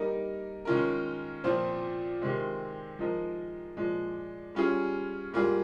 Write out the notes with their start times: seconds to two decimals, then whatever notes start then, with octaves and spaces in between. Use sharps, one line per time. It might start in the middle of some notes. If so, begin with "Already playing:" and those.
Already playing: G3 A#3 D#4 A#4
0.65 D#3 G#3 C#4 F4 A#4
1.44 A#2 F3 C4 F4 C5
2.21 C3 D#3 G#3 C4
2.99 F3 G#3 D#4 A#4
3.77 A#2 F3 G#3
4.55 G3 C#4 F4 G#4
5.32 G#2 G3 A#3 F4 G#4